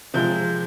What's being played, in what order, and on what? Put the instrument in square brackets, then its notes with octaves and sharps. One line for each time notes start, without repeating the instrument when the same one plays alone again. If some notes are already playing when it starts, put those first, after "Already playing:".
[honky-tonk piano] C3 F3 G#3 G6